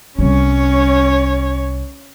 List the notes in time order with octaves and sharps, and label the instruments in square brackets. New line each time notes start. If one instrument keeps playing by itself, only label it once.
[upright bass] C2 G3 [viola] C#4 C#5